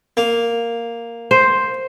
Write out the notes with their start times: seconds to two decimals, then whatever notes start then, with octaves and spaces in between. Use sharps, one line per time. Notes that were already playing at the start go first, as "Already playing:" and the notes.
0.17 A#3
1.31 C5